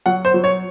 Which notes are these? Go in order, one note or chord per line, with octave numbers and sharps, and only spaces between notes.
F#3 F#5
C5
F#3
C#5